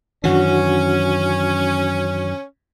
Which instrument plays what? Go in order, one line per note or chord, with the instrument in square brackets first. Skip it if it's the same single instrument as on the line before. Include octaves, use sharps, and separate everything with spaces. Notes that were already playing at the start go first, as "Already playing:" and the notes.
[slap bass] F#2 D#3 E3 [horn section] C#4 [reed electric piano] D4 F#4